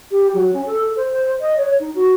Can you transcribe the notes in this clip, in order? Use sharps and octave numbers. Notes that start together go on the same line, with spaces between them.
G4
F#3
C#4
A4
C5
D#5
C#5
D#4
F#4